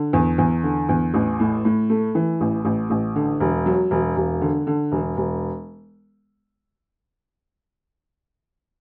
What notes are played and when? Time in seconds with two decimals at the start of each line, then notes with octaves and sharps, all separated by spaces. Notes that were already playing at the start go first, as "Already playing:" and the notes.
Already playing: D3
0.13 E2
0.38 E2
0.63 D3
0.89 E2
1.14 A1
1.40 A2
1.65 A2
1.90 A3
2.15 E3
2.41 A1
2.65 A1
2.90 A1
3.16 D3
3.40 E1
3.66 F#3
3.91 E1
4.17 E1
4.41 D3
4.67 D3
4.92 E1
5.17 E1